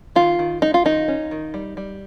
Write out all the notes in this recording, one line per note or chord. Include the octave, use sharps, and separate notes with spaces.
D#3 F4
D#3
G#3 D#4
F4
D#3 D#4
C#4
D#3
G3
G3